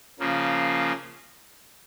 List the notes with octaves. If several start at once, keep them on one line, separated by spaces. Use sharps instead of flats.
C#3 F3 A#3